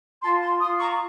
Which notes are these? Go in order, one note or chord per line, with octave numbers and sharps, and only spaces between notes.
F4 A5 C6
A5 C6
F4 C6 D#6
A#5 C#6